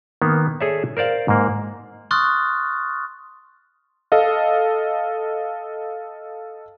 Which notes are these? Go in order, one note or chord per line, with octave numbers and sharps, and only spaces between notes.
D#3 A#3 B3
G#4 A4 C#5 D5 E5
A#4 C5 D5 F5
G#2 A#3
C6 C#6 D#6 F6 F#6 A6
A4 D#5 F5